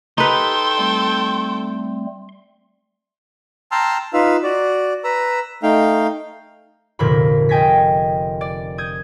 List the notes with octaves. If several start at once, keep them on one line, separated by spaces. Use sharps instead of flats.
D#4 G4 A4 B4 G5 C6
G3 A3 C4
G5 A5 A#5 C6 E6 F6
D#4 F4 B4 F5 E6
F#4 D5
B4 A#5 E6
A3 D#4 F5 G5
F1 A#2 D3 A#4 C5 B5
D#5 G5 G#5 G#6 A#6 B6
D5
D#6 G6 G#6